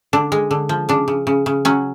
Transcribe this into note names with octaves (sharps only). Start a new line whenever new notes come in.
D3 D4
G#3
D3
F3
C#3 D4
C#3
C#3
C#3
F#3 C#4